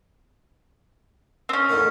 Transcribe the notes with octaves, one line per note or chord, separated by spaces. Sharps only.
C4 C#4
E2 A2 D#3